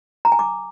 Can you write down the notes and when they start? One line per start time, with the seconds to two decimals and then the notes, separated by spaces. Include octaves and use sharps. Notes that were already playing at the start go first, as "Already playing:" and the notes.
0.25 A#5
0.32 G#5
0.39 D6